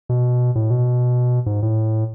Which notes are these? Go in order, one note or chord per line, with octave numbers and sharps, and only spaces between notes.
B2
A2
B2
G#2
A2